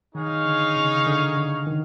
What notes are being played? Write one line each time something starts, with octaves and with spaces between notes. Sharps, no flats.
D#3 D#4 G#4 C#5 F5
D3
C#3
D3
D3
D#3